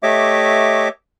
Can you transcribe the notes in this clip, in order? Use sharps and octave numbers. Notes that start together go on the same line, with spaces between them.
A3 G4 C#5 D#5 E5 D6